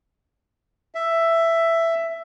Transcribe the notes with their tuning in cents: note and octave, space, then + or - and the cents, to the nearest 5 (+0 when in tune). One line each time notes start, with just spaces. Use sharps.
E5 +10